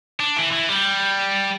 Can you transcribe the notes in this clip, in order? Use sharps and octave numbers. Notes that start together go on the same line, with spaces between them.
D4
E3
E3
G3